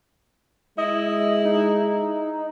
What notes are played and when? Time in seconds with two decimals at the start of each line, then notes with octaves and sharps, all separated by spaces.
0.78 G#3 E4 D#5
1.45 D#4